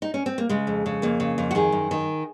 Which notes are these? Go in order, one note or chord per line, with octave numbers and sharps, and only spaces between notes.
D#4
C#4
C4
A#3
C#3 G#3
F2
C#3
F2 A#3
C#3
F2
F#4
D#3 G#4
F#2
D#3